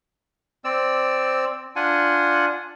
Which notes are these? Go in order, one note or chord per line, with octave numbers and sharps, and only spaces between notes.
C4 D5 E6
D4 F4 F#5 G#5